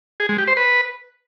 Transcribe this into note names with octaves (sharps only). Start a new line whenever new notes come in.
G#4
G#3
G4
C5
B4